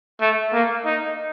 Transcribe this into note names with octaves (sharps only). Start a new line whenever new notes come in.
A3
A#3
D#4